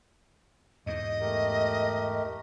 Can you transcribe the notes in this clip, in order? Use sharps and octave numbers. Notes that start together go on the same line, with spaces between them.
E2 G#2 D#5
A3 G4 A#4